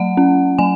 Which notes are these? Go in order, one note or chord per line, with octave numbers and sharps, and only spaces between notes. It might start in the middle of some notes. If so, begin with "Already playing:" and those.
Already playing: F#3 F#5
C#4
F#3 G#5